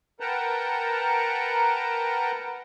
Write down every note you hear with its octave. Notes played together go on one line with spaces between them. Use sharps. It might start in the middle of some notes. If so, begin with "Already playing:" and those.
A#4 B4 F#5 G5 A5 A#5